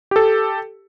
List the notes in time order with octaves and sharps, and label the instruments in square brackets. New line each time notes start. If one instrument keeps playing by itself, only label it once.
[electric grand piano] G4 A4